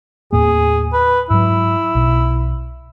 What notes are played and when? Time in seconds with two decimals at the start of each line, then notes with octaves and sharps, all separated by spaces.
0.33 D#2 A2 A#3 G#4
0.93 B4
1.30 G#2 F#3 E4
1.95 B1 B2